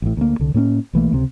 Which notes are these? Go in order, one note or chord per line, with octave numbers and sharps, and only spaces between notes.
A1 A2
D2 A#3
C2 D3
A2 A#3 C4 C#4
B1 E3 A3 A#3
C#2 C3